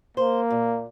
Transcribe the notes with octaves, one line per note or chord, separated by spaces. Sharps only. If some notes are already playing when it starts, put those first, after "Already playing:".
A#3 C5
A#2